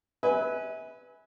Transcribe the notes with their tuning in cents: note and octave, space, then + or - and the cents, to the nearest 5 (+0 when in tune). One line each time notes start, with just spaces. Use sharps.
B4 +0 E5 -35 G#5 +0